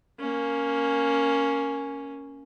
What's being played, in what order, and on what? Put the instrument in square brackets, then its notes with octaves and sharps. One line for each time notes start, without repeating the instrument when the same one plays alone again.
[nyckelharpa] A#3 C#4